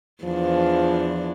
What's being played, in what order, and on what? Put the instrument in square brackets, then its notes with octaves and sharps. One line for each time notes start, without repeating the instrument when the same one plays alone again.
[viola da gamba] E2 D4 [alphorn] F3